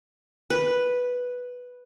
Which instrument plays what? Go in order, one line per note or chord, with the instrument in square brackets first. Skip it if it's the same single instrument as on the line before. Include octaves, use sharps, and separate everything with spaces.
[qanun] B4